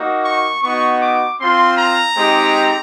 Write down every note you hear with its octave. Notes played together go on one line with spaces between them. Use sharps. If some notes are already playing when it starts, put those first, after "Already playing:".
Already playing: A#3 D#4 F#4
C#6
B3 D#4 F#4 C#6
D6
C4 F4 C6
A#5
G#3 C4 D#4 G4